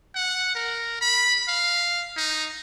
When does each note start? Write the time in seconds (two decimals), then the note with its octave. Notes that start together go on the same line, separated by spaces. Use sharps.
0.15 F#5
0.55 A#4
1.01 B5
1.48 F5
2.17 D#4